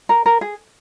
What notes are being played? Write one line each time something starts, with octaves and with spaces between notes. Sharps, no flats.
A#4
A#4
G#4